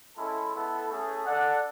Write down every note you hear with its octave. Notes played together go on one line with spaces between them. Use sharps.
G#3 C#4 E4 A4
B3 E4 A4
A3 C#4 G#4
D4 A4 D5 F#5